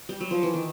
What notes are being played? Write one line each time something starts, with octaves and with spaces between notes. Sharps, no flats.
G3
F#3
F3
E3
D#3